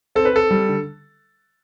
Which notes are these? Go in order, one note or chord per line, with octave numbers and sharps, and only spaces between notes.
C4 A4
B4
C4 A4
G3
D3